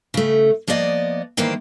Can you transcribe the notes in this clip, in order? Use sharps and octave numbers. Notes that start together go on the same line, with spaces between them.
C#3 A3
F3 A#3 B3 D5 D#5
D#3 E3 G3 A#3 C5 G5